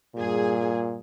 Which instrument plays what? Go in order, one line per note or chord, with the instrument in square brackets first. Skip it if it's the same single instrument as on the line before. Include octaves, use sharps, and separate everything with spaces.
[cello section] G2 G#4 [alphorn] A#2